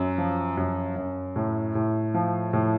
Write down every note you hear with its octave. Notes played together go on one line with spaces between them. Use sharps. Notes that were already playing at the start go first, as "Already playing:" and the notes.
Already playing: F#2
F3
F#2
F#2
A2
A2
F3
A2